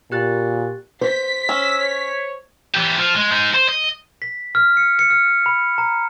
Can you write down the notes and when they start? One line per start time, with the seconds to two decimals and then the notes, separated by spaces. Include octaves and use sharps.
0.12 A#2 G4 F#6 A6
1.01 C5 B6
1.49 C#4 E6
1.79 C#5
2.74 E3 G4
2.99 F3 F4
3.15 G#3
3.32 G#3 D#4
3.54 C5
3.69 D#5
4.22 B6
4.55 F6
4.77 C#7
4.99 C#7
5.10 F6
5.46 B5
5.78 A#5